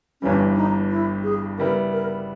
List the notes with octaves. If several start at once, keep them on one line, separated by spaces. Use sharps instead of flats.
G1 G2 E3 G3 C#4
D#4
E4
G#4
C#3 G3 B3 E4 A#4
A#4